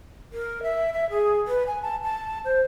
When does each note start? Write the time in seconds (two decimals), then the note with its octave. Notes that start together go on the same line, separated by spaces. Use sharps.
0.33 A#4
0.63 E5
0.93 E5
1.10 G#4
1.48 B4
1.67 G#5
1.82 A5
2.04 A5
2.45 C5